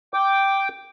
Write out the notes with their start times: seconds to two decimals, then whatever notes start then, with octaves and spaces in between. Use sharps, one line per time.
0.14 G5 D6